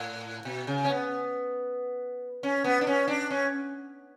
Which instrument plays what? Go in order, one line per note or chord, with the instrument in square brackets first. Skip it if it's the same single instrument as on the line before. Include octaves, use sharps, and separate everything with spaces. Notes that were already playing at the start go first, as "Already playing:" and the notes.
Already playing: [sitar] A2
B2
C#3
C#4
B3
C#4
B3
D4
C#4
D4
C#4